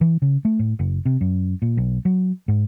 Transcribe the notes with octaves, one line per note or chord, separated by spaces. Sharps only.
E3
C#3
A3
A2
F#1
C3
F#2
A#2
B1
F#3
G#2